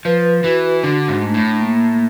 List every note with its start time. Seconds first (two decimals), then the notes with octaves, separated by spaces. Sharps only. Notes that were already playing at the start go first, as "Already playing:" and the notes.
0.05 F3 B4
0.44 E3 F#4
0.83 D3 D4
1.08 G#2
1.22 A3
1.34 A2
1.60 A#3